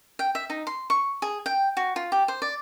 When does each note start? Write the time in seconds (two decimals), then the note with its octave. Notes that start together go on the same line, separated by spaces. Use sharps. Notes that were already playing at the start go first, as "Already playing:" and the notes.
0.19 G5
0.35 E5
0.50 D#4
0.67 C6
0.90 C#6
1.22 G#4
1.46 G5
1.77 F#4
1.96 F4
2.12 G4
2.28 C5
2.42 D5